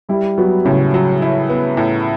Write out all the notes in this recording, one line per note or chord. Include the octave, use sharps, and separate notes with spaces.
G3 E4 G4
F#3 B3 F#4
A2 C#3 C#4
F#3
E4
B3
A2